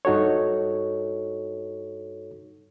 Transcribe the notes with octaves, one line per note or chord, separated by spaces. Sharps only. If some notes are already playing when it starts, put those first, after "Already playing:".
G2 D#4 F#4 A4 C#5